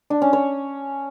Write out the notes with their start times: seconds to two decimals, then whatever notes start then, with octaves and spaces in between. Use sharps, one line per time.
0.10 D4
0.22 C#4
0.33 C#5